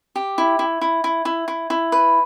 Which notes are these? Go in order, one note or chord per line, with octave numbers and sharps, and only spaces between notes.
G4
E4
E4
E4
E4
E4
E4
E4
B4